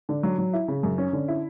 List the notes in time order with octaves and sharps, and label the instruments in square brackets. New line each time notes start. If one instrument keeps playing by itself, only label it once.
[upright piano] D3
F#3
F#3
E4
C#3
F#2
C#4
D3
E4